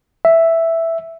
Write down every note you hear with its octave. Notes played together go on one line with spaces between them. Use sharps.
E5